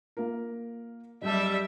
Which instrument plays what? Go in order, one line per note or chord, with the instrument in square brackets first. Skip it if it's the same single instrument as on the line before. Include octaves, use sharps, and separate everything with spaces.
[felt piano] A#3 F4 A#4
[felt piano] F#1 A5 [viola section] G3 E5